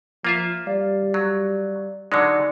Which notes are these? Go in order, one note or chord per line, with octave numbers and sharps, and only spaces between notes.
F3 A#3 F4 E5
G3 D5 F5
F#3
D3 F#3 G#3 D#4 D5 C#7